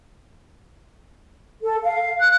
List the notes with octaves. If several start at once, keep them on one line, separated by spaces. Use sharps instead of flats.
A4
F5
F#6